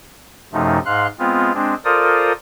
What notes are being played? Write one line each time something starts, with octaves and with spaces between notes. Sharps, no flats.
F#2 C3 F3 A3 D#4
G#2 F5 C6 F#6
G#3 B3 C4 F4
G#3 C4 D4
F4 A4 A#4 C5 D5 D#6